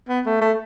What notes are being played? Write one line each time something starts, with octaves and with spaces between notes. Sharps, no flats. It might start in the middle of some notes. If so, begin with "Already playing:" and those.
B3
A3
A3